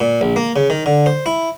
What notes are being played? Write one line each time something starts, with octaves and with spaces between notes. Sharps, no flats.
A#2
A#1
A#3
C#3
D#3
D3
C5
E4